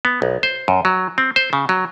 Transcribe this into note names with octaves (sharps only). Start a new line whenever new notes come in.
B3
B1
C5
F#2
F#3
C4
C5
C#3
F#3